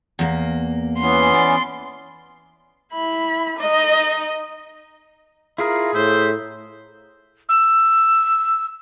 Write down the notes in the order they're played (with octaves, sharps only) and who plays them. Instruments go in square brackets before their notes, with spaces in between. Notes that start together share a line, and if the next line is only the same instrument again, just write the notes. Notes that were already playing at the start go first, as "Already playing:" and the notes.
[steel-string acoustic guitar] E2 A#3
[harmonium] E3 B3 C#4 [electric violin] C6
[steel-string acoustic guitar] D5
[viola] E4 B5
D#4 D#5
[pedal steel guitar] E4 F4 A#4 [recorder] G#4
[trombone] A2 [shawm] C5 [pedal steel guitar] E5
[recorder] E6